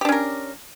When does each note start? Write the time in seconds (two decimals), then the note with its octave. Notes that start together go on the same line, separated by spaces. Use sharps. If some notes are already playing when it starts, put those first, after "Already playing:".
0.01 G4
0.05 D4
0.09 C#4
0.12 A#4